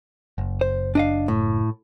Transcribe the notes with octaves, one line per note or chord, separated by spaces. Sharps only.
F#1
C5
D4 D#5 F5
A2